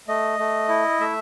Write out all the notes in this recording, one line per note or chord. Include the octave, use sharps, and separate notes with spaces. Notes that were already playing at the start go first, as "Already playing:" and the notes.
A3 D#5
A3
E4
A3 E5